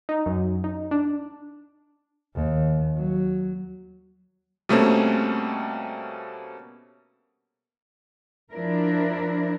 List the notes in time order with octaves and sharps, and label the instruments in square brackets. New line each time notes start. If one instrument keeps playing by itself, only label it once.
[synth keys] D#4
F#2
D#4
D4
[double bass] D#2
F#3
[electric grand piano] B2 G3 A3 A#3 C4 C#4
[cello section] F3 D4 E4 A#4